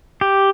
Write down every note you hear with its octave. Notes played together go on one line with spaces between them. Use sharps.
G4